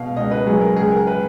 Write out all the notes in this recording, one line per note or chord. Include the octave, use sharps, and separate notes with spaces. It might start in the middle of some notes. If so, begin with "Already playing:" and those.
Already playing: B2 F5
C#2 D#5
B4
F#3 G#4
A#4
C#2 G#4
A#4
B4